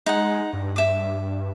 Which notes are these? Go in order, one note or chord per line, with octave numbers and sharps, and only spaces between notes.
G#3 D#4 F#5
G2
E5 D6